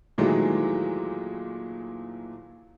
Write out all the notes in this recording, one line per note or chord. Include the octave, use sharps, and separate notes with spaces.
A#2 D#3 E3 F#3 G#3 A3